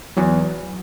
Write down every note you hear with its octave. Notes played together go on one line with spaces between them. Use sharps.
E2 F#3